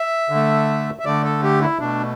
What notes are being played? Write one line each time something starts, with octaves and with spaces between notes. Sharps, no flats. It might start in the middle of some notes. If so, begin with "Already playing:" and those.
Already playing: E5
D3
A3
E5
D3 A3 D5
A4
G4
E4
B2 A3 D4